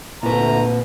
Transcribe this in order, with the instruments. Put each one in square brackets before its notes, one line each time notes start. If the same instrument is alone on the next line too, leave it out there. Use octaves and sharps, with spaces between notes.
[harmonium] D2 D3 A#5 [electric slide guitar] A#2 B4